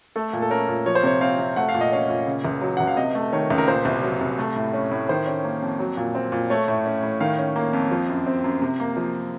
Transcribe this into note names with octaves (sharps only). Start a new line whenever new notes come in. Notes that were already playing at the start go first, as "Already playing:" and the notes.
A3 A4
A#2
A4
C#4 A#4
A#2
F3 C#5
C5
C3 C#5
C4 F5
C3
A3 F#5
F5
A#2
D#5
C#4 F5
A#2
C#3
C#2
F#3
C#2 F#5
F5
C3 D#5
A3
D#3 C#5
C#2
A#4
A#2 C5
C2
F#3
C2
A3
A2
C#4
A2
D#3 C5
C#4
A#3
F2
F#3
A#2
C4
A#2
A3 C#5
A2
C#4
A2
D#3 F5
C#4
A#3
F2
F3
F#2
C4
F#2
C3
A#3
F3